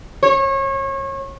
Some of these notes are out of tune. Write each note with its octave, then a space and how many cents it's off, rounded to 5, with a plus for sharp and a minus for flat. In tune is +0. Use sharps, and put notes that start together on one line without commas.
C#5 -30